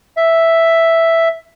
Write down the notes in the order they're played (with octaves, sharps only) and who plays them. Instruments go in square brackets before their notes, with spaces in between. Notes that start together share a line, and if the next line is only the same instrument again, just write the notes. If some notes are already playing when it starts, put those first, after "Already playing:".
[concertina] E5